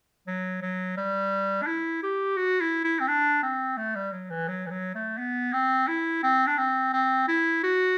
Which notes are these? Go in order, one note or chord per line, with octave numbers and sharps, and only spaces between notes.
F#3
F#3
G3
D4
E4
G4
F#4
E4
E4
C4
D4
C4
A3
G3
F#3
E3
F#3
E3
F#3
A3
B3
C4
E4
C4
D4
C4
C4
E4
F#4